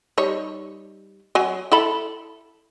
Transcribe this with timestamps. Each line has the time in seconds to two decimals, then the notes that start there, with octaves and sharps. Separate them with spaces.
0.18 G3 D#4 C#5
1.35 F#3 G#5
1.72 E4 A4 B5